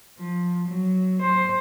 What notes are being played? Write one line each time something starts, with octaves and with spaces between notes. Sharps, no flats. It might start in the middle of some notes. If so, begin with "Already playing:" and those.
F3
F#3
C5